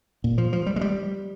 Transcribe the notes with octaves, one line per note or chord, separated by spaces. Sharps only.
A#2
F3
F3
G3
G#3
G3